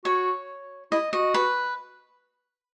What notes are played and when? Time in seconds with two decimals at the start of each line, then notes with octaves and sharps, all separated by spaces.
0.05 F#4 C#5
0.92 E4 D#5
1.13 F#4 D#5
1.34 B4